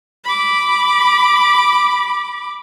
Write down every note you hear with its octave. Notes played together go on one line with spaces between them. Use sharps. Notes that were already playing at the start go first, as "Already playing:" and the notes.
B5 D6